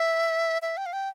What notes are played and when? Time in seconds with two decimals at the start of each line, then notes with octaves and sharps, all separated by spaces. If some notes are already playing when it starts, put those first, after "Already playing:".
Already playing: E5
0.62 E5
0.77 G5
0.86 F5
0.93 G5